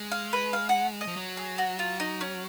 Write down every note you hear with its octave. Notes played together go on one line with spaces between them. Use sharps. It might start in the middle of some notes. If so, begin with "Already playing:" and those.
Already playing: G#3
F5
B4
F5
F#5
D#5
F3
F#3
G#4
F#4
F4
D#4
C#4